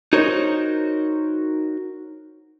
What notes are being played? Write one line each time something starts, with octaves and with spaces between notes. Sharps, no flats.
D#4 F#4 A#4 C5 C#5